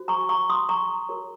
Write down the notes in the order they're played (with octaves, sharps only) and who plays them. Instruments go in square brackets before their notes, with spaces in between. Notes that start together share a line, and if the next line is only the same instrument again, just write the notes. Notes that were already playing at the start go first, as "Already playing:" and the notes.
Already playing: [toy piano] F#4 C5
A#5 C#6
A#5 C#6
C6 D#6
A#5 C#6
F#4 A#4 C#5